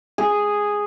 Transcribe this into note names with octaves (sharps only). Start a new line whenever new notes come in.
G#4